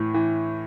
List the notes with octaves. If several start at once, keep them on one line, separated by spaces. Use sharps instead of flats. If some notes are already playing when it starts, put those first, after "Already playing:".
Already playing: A2 E3
E3